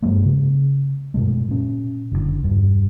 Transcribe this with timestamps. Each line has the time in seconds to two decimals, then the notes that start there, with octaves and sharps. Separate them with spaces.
0.02 G2 F#3 G#3 A#3
0.25 C#3
1.14 F#2 B2 G#3 A3
1.48 A#2 C#4
2.12 F#1 A#2 D3
2.43 E1 G2